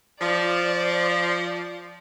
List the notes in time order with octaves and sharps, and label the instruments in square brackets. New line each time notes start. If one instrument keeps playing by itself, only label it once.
[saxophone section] F3 [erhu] D5